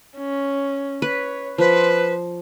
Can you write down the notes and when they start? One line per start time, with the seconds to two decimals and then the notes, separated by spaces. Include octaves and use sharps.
0.17 C#4
1.02 B4 C#5
1.58 F3 B4 C5